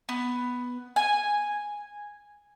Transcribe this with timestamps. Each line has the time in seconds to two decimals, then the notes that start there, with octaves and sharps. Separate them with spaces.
0.09 B3
0.96 G#5